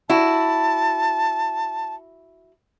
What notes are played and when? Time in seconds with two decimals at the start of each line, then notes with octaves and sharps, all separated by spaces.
0.10 E4 F#4 A5